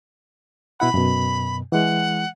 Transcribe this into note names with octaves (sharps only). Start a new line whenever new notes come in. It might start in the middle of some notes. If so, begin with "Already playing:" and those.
B2 E4 F#5 B5
F#2 B2
E3 G#3 F#5